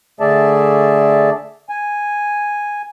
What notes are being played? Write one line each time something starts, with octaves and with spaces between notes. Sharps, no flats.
D3 A3 G#4 D5 E5 A5
G#5